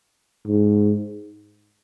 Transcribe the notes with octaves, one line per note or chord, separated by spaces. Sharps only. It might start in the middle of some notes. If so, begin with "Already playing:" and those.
G#2